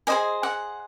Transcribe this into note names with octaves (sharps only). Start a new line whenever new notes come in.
G#4 C5 D#5 G#5
F#5